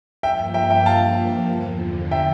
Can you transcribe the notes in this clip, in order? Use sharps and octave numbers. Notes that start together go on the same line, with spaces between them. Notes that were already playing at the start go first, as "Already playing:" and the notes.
G2 F3 A#3 E5 G5
E5 G5
E5 G5
F5 A5
E2 D3 F3
E5 G5